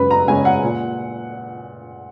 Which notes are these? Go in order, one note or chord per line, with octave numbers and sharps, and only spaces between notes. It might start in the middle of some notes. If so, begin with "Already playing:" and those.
Already playing: F#2 C#3 G#3 C#4 B4
A#5
C#3 G#3 C#4 G#5
F#5
A#2